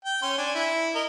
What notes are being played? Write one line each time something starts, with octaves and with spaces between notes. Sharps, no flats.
G5
C#4 C6
D4 G#5
E4
A#4 D#5